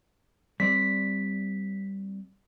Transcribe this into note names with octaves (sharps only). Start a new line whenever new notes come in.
G3 C4 D5 B6